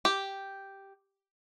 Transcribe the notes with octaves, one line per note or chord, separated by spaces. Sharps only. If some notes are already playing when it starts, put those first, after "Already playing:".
G4